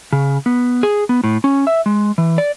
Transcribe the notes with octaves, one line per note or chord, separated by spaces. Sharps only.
C#3
B3
G#4
B3
A2
C#4
E5
G#3
E3
D5